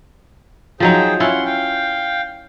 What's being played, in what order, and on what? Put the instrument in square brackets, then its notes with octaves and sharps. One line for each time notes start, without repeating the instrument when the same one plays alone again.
[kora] F3 F#3 D#4 [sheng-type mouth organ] G#4 C5 G5
[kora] C#4 E4 F4 [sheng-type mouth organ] F#5 C6
[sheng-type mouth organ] F5 G5